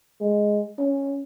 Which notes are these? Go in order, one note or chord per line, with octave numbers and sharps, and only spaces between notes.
G#3
C#4